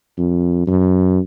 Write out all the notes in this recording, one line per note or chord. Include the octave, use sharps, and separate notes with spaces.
F2
F#2